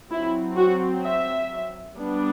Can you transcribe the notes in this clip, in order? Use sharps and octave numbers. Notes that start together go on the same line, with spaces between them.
F#3 C4 E4
F#4
E5
G3 B3 D4